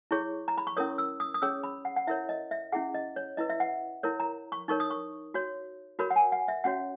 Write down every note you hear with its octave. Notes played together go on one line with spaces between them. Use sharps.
E4 G#4 C#5 C#6
A#5
B5
C#6
C#4 E4 A#4 C#5 D#6
E6
D#6
D#6
C#4 G#4 C#5 E6
B5
F#5
F#5
E4 A#4 C#5 E5
D#5
E5
C#4 E4 G#4 F#5
D#5
C#5
E4 B4 D#5
E5
F#5
E4 A#4 C#5
A#5
C#6
D#4 A#4 C#5 C#6
D#6
C#6
F#4 C#5
F#4 A#4 C#5 B5
F#5
G#5
F#5
E5
C#4 F#4 C#5 F#5